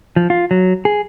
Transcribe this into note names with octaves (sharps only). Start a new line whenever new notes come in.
F3
F4
F#3
G#4